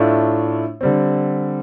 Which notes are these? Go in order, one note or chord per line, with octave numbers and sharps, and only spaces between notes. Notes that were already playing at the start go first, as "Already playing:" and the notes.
Already playing: A2 A3 D4 F4
D3 G3 C4